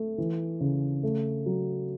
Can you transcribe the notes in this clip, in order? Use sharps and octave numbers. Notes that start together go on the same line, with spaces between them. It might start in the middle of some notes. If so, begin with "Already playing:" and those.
Already playing: A3
E3
C#3
A3
F#3